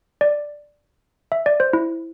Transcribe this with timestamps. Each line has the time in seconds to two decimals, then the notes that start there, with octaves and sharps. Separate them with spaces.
0.21 D5
1.32 E5
1.46 D5
1.60 C5
1.73 E4